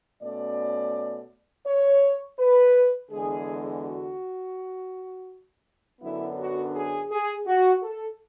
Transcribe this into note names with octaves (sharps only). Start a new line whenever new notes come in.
B2 A3 C#4 D5
C#5
B4
E2 D3 G#3 G#4
F#4
F#2 D3 F#3 B3 D4 E4
F#4
G#4
G#4
F#4
A4